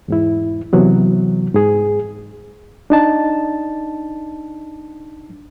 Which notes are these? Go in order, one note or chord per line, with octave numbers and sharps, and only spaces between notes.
E2 G#2 E4
C3 E3 F#3 B3
G#2 G#4
D4 D#4 A5